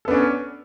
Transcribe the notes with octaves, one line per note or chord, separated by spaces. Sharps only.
B3 C#4 D4 A4